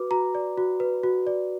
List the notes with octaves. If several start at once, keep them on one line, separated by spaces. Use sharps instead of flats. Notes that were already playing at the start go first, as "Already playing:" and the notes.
Already playing: F#4 B4 D6
F#4 A#5
D5
F#4
B4
F#4
D5